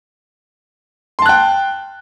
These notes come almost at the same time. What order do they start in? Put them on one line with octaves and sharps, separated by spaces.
C6 A5 F#6 G5